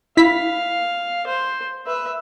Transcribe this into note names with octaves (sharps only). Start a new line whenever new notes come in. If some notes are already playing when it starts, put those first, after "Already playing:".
E4 F5 B5 B6
C5
B4 E5